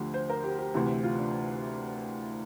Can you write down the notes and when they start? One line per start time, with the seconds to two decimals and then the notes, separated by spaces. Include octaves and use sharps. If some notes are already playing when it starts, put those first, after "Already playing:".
Already playing: D2 D3 F3 G4
0.14 C5
0.29 A#4
0.44 G4
0.59 G4
0.74 D2 C3 E3
1.03 F4
1.19 D4